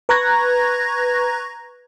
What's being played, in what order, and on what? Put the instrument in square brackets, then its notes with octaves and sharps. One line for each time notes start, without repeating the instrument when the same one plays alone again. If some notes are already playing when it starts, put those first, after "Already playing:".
[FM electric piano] B4 A#5 C#6 F#6 G#6 A#6